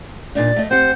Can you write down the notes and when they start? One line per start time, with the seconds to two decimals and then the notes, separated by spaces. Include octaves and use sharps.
0.35 A#2 D4 D#4 D5
0.56 A3 D#5
0.71 C4 G4 C5 F#5